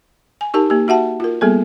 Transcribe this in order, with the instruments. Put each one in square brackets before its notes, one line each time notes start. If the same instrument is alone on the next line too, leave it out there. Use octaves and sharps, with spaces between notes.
[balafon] G#5
D#4 G4 A#4 A5
A#3 G4
F#4 E5 F#5 A5
F4 A#4
G3 A#3 B3 G#4 A4